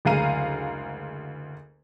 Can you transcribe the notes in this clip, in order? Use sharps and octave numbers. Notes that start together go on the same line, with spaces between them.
F#1 D2 G#3 F5 A#5 D#7